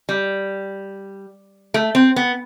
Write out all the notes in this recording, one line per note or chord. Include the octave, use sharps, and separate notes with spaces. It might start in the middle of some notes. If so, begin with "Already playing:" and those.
G3
A3
C4
B3